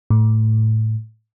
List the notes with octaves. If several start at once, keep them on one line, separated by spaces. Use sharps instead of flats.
A2